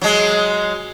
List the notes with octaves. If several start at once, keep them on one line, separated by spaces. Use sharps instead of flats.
F#3 G#3